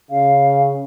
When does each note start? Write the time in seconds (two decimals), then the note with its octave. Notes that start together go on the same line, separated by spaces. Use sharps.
0.11 C#3 F5